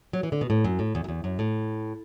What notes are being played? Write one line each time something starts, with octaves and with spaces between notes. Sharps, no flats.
F#3
E3
D3
B2
A2
F#2
A2
E2
F#2
E2
F#2
A2